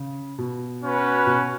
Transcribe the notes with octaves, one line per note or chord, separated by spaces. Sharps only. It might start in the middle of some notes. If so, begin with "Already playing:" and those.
Already playing: C#3
B2
C#4 F#4 B4
B2